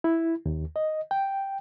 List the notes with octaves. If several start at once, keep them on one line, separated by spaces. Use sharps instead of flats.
E4
D#2
D#5
G5